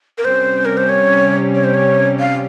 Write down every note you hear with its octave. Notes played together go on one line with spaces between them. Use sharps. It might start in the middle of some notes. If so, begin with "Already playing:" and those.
A#4
C3 G3 C#4 G4 C5
A#4
C5
C#5
C#5
C5
C#5
F5